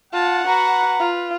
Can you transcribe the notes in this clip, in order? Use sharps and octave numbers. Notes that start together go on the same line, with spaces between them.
F4 F#5 A5
F#4 B4 A#5
F4